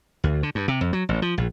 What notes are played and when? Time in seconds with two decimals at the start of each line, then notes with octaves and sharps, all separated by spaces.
0.24 D2
0.43 D3
0.55 G2
0.68 C3
0.81 F2
0.93 F#3
1.09 A1
1.22 F3
1.38 A#1